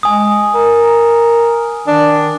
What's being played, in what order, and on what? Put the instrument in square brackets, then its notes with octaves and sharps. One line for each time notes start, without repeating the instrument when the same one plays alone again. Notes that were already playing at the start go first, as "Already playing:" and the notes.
[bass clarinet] G#3 [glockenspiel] G#5 D#6
[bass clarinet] A#4
[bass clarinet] D#3 [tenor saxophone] D4